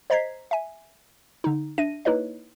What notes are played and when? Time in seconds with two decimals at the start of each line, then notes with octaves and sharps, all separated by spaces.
0.10 C5 D#5 A#5 G#6 B6 C7
0.51 E5 G#5
1.44 D3 D#4
1.78 D4 E5 A#6 D#7
2.05 A#3 D#4 E4 B4 C#5 D#5